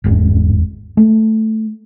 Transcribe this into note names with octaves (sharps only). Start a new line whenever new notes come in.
D1 G1 E2 G#2
A3